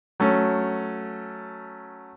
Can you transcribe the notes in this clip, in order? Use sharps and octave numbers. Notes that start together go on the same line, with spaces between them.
F#3 A3 C#4